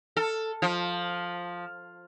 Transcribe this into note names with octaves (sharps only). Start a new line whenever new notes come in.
A4
F3